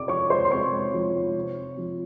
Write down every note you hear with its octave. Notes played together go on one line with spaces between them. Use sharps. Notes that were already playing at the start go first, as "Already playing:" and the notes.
Already playing: C3 D5 D6
F3 C#5 C#6
C5 C6
C6
C3 C#5 C#6
F3
C3
F3